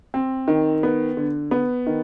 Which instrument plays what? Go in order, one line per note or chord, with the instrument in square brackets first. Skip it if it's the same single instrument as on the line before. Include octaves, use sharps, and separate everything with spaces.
[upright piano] C4
D#3
B3
D3
B3
D#3